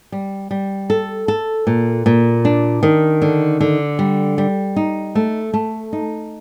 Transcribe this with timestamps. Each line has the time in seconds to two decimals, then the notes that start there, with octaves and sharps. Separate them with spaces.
0.12 G3
0.51 G3
0.90 A4
1.28 A4
1.67 A#2
2.06 A#2
2.45 D4
2.83 D#3
3.22 D3
3.60 D3
3.99 G3
4.38 G3
4.76 D#4
5.15 A3
5.54 A3
5.93 D#4